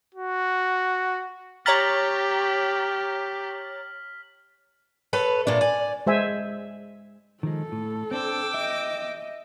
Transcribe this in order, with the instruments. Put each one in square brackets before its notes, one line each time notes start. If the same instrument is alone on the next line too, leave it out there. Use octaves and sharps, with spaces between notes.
[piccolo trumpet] F#4
[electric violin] G4 [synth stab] C#5 A#5 A6 [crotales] F6 B6 F#7
[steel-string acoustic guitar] A4 B4 C#5
A#2 A3 D4
D5 G#5
[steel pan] G#3 C5 E5 G#5
[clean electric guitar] D#3 F3 G#3 [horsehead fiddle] A4
[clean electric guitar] A2
[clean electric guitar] C4 D4 C5 [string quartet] G5 D6 E6
[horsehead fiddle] D#5 [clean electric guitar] E5